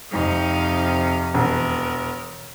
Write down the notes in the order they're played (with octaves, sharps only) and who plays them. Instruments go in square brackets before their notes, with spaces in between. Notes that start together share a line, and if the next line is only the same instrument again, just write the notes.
[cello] F2 C3 [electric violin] D#4 F5
[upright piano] E1 [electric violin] B3 A#4